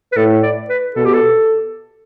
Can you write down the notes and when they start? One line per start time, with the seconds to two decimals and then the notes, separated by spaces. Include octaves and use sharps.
0.12 B4
0.16 A2 A4
0.42 D5
0.69 B4
0.95 B2 A4
1.05 G4
1.14 A4